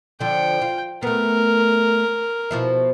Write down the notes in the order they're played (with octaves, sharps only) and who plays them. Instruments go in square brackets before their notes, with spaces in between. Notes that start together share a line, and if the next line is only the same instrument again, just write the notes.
[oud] D3 F3 [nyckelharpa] G5
[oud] F4
[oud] A3 B3 [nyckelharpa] A#4
[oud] B2 F3 E4